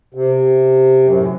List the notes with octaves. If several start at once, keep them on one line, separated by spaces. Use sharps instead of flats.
C3
F#2
A2